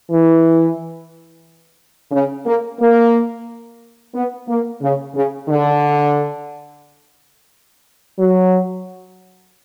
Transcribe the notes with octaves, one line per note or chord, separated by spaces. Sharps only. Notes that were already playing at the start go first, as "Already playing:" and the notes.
E3
C#3
A#3
A#3
B3
A#3
C#3
C#3
D3
F#3